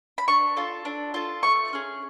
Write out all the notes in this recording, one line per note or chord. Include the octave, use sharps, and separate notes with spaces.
B5
D4 C#6
F4 A4
D4
F4 A4
A3 C#6
C#4 G#4